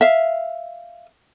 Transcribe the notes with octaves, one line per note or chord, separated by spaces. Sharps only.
E5 F5